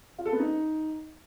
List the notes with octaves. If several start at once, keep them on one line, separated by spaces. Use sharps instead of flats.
F4
A4
B3
D#4